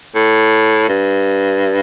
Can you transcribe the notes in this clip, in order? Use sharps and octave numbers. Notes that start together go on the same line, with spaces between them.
A2
G2